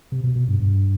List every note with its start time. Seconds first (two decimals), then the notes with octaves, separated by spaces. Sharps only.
0.12 C3
0.24 B2
0.36 B2
0.48 G2
0.60 G2